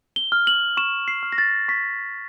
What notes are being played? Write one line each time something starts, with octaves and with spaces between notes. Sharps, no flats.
G7
F6
F#7
C#6 E7
C7
F6
A#6
A6
C#6 B6